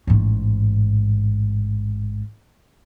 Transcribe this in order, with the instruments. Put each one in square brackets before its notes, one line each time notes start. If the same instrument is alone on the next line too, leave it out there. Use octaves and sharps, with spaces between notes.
[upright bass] A1 G#2